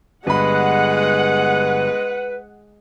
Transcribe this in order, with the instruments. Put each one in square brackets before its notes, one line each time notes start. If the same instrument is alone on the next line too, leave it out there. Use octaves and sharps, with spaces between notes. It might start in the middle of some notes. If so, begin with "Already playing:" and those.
[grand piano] G1 B5 [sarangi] G#3 [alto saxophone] B4 [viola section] F#5